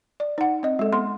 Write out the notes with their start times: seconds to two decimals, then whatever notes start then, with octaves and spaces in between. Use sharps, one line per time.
0.20 D5
0.38 D#4 F#5
0.63 C4 D#5
0.79 G#3 A4
0.93 B3 C6